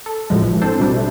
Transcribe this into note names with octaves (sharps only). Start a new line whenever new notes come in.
A4
A2 F3 F#3 G#3
A1 E3
C4 D4 A4 C5
B2 G3 D4
A3